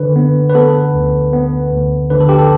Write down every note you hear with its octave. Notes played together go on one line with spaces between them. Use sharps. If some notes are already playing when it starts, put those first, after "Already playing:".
Already playing: D3 B4
B3
B4
B3 A4
D2
B3
D2
D3 B4
A4
G4
A4